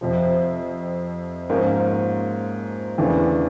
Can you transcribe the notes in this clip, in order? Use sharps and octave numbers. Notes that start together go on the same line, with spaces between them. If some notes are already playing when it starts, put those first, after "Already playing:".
F2 C3 F3
G#2 F3 A#3 C#4
E2 C#3 E3 A3 D4